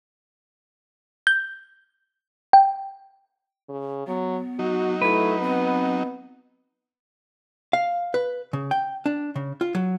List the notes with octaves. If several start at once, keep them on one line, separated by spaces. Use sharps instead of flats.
G6
G5
C#3
F#3 B3
F#3 D#4 F#4
A3 E4 B4
B3 C4
F5
B4
C#3
G5
D4
C#3
F4
F#3